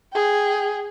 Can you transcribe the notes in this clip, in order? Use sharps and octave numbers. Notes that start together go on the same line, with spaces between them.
G#4 G5